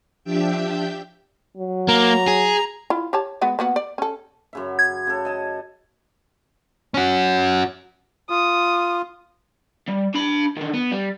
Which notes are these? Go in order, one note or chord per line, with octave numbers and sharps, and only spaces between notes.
F3 D4 G4 E5 G5 G6
F#3
A#3 A#5
G#4
E4 F4
G4 C#5 A5
G#3 B3 F#4
A#3 B3 F#4
D5
C#4 A4
F#2 C#3 E5
G#6
C#3 A4
D#5 A5
C#4 F#4
F4 D#6
G3
D4 B5
D3 D#3
B3
G3